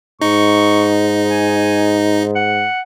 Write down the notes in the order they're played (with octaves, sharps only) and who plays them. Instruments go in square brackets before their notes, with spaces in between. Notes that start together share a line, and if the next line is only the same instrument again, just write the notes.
[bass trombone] G#2 [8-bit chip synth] D#4 [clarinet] C#6
[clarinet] G#5
F#5